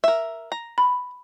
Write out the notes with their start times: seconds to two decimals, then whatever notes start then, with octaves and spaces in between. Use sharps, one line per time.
0.04 A#4 E5
0.52 A#5
0.78 B5